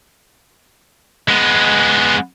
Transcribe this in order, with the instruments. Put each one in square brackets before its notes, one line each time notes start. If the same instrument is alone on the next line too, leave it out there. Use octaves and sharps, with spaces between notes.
[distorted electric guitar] G#3 B3